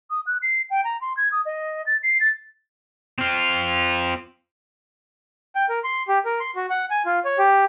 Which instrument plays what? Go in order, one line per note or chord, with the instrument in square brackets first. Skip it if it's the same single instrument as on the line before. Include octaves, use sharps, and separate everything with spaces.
[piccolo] D#6
F#6
C7
G5
A#5
C6
G#6
D#6
D#5
A6
C7
A6
[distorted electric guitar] C4 F4
[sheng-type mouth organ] G5
A#4
C6
G4
A#4
C6
F#4
F#5
G#5
F4
C#5
G4